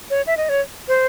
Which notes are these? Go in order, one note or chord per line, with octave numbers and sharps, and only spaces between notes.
C#5
E5
D#5
C#5
C5